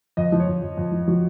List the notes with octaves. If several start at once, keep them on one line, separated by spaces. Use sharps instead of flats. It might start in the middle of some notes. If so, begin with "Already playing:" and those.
F2 D#5
F3
C#5
F2
F2
F2
F3
F3 F#4